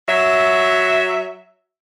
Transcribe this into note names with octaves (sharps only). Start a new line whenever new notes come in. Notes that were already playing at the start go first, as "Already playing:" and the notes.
F#3 E5